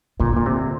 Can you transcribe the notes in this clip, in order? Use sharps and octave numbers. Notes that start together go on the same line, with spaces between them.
A#2 D3
A#2
C3